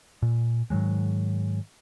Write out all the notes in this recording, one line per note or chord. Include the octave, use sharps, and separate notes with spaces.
A#2
G#2 D#3 F#3 G#3